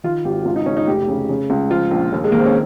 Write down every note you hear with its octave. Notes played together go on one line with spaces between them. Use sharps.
D#3 F4
G#1 G4
C#2 F4
D#4
C#3 C#4
D#4
F1 G4
C#3
C#3
C#2
F3 F4
A#1
D#2
G#3
D#3 A#3
C4
C#4